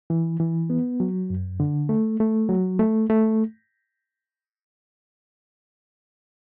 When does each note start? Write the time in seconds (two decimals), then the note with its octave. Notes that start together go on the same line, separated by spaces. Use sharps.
0.10 E3
0.40 E3
0.70 B3
1.00 F#3
1.30 F#2
1.60 D3
1.89 A3
2.20 A3
2.49 F#3
2.79 A3
3.09 A3